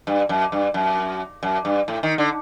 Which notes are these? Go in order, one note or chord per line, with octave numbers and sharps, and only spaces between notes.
G2
F#2
G2
F#2
F#2
G2
A2
D#3
D3